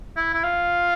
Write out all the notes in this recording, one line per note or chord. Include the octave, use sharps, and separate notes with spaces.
E4
E4
F4